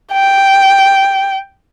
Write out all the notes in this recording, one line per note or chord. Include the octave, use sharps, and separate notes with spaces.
G5